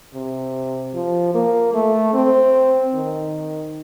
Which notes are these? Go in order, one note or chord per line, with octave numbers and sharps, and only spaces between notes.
C3
F3
A#3
A3
C4
D#3